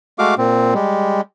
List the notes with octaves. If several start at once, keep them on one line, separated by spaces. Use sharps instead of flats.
G#3 A3 F#4 F5 D6
A#2 C4
G3 G#3